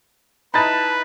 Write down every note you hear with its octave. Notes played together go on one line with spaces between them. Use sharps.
D#4 E4 B4 A5 B5 A6